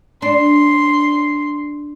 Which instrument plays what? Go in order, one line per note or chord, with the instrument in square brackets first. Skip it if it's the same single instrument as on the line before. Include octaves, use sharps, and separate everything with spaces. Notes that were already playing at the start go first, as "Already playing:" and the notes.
[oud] D4 [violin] C6